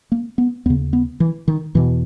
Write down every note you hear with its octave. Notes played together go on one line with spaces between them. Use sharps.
A#3
B3
D#2 C#3 B3
B3
E3
D#3
E2 B2 E3